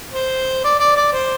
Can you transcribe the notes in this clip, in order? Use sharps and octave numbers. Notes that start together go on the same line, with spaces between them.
C5
D5
D5
D5
C5